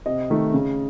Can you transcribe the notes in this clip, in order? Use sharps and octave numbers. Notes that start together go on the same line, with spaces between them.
C3 D#5
D#3 A3
C#3